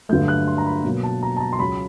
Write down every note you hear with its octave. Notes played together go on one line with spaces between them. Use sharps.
G2 D3 F#3 A3 G6
F#6
C6
A#5
B5
B2 F#3 A#3
A5
A#5
A5
A#5
C6
C#2 C#3 F#3 B5